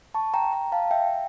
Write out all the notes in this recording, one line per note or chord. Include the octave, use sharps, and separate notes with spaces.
A5 C#6
G5 A#5
G5 A#5
F5 A5
E5 G5